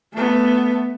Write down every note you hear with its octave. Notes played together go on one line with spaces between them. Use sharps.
A3 B3